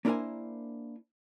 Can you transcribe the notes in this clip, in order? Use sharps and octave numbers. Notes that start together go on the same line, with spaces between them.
A#3 D4 E4 A#4 C5 G#5